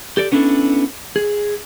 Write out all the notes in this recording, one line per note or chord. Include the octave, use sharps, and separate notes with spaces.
G4 A4 D5
B3 C#4 D4 E4 G4 A4
G#4